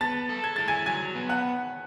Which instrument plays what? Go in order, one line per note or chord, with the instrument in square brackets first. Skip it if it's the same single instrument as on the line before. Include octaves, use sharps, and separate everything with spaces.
[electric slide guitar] B3 [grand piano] A5 A6
[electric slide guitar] A4
[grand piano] G#6
[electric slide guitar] E4 [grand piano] A6
[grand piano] G#5 G#6
[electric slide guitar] F#3 [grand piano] G#5 G#6
[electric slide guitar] B3
[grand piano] F#5 F#6